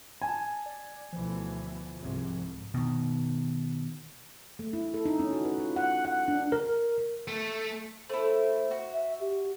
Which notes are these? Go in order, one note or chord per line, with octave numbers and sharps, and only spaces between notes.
G#5 A5
D5
D2 B2 E3 F3
C2 G#2 C3
B2 D#3
A3
E4
A4
D#4
C#4
F#4
B4
F4
F#5
F#5
D4
A#4
A3
A3 E4 C5
F#4
E5
G4